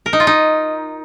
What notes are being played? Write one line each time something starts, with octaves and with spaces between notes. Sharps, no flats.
A#4
D#4
F4
D#4